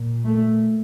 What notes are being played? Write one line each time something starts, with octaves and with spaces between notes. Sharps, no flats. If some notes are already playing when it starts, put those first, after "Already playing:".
Already playing: A#2
A3